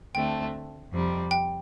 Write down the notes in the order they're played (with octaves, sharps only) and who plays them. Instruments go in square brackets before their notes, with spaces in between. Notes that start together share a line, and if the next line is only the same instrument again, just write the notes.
[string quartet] D2 D3 A3 C4 [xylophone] G5
[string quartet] F2 C3 G3 C4
[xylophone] G5